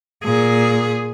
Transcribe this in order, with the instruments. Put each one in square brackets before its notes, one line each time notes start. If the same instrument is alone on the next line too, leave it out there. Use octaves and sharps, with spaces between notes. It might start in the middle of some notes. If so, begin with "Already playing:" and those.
[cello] A#2 G#4